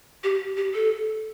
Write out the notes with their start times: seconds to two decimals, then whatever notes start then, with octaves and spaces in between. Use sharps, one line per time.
0.24 G4
0.57 G4
0.74 A4